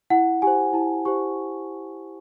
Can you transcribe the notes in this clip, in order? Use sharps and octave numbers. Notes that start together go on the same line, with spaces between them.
E4 F#5
G4 C5 G#5
E4 A5
G4 C5 C#6